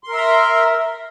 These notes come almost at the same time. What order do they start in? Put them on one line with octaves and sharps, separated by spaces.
C6 A#4 E5 A#5